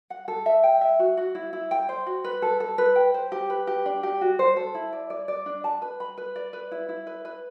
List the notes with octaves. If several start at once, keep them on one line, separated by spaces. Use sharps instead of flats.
F#5
A4
E5
G5
E5
F#4
F#4
E4
E4
G5
C5
F#4
B4
A4
A4
B4
G5
C5
G4
B4
G4
D4
G4
F#4
C5
A4
E4
D5
D5
D5
D4
A5
B4
B5
B4
D5
B4
E4
E4
B4
B4